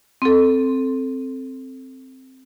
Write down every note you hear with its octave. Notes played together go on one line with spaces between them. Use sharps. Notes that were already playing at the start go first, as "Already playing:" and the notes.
C4 A4